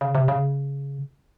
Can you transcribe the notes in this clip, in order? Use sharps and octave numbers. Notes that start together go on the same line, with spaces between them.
C#3
C3
C#3